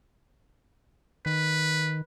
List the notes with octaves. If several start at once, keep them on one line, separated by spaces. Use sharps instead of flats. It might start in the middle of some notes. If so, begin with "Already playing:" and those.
D#3 B4